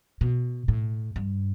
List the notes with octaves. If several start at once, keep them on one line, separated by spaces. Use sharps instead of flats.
B2
A2
G2